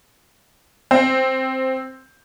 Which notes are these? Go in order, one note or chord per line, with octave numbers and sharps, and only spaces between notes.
C4